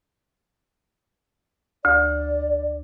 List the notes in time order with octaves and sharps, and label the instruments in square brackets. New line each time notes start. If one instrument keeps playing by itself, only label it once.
[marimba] D2 [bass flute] D5